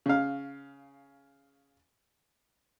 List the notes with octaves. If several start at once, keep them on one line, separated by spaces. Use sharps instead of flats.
C#3 F5